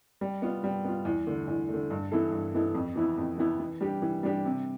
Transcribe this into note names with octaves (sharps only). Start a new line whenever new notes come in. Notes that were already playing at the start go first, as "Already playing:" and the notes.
G3
B3 F4
G3
B3 F4
E2
D3 A3
E2
D3 A3
G2
E3 B3 E4 A4
G2
E3 B3 E4 A4
F2
E3 B3 E4
F2
E3 B3 E4
E3
G3 D4 G4
E3
G3 D4 G4
C3